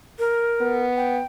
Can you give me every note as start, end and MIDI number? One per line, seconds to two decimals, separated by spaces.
0.19 0.81 70
0.61 1.21 59
0.96 1.26 79